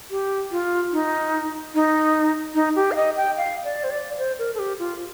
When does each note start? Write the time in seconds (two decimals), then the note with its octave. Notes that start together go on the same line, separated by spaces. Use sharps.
0.11 G4
0.51 F4
0.92 D#4
1.74 D#4
2.55 D#4
2.76 G4
2.92 F5
2.96 D#5
3.17 G5
3.37 F5
3.64 D5
3.84 C5
3.91 D5
4.18 C5
4.39 A#4
4.55 A4
4.59 G4
4.79 F4